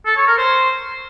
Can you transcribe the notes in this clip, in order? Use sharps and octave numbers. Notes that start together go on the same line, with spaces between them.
A4
C#5
A#4
C5